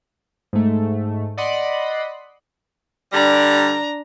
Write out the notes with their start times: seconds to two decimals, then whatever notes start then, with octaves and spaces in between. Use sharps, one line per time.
0.53 G#2 A3
1.37 D5 D#5 F#5 B5 C6
3.13 D3 G3 D4 A#5